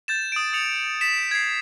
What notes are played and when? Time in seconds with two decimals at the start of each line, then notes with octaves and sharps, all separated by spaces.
0.08 G6 A6 E7
0.32 D#6 D7
0.53 D#6 C#7 F7
1.01 B6 E7
1.31 G#6 C7